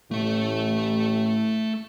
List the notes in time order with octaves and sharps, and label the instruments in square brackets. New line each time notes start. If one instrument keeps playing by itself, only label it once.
[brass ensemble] A1 [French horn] A2 [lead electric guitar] A3 E5